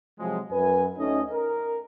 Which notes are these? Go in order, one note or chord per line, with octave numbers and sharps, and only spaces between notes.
C3 F3 F#3 G#3
F#2 B4 G#5
D2 A3 C#4 D#4 D#5
A#4